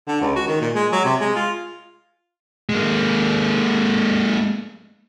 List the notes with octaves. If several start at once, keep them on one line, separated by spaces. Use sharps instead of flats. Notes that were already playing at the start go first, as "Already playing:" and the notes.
D3
C#2
F#4
D#3
A#2
G#3
F#3
C3
G#3
F4
G#3 A#3